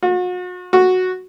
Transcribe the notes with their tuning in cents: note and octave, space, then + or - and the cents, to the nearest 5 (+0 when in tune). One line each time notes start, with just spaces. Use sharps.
F#4 -40
F#4 -5